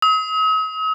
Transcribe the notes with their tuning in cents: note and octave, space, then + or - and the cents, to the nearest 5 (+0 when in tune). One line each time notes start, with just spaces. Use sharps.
D#6 +45